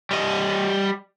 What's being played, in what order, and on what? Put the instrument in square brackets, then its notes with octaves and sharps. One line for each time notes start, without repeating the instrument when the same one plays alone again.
[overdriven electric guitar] G3 D#5